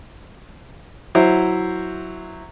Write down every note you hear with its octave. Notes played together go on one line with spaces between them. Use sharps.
F#3 E4 C5